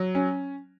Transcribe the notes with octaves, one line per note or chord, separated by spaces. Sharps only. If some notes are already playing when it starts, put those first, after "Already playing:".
Already playing: F#3
C#4